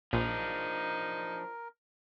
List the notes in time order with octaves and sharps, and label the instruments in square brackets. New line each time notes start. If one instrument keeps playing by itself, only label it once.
[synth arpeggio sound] A#1 [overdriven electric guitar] F3 D4 [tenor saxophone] D#4 [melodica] A#4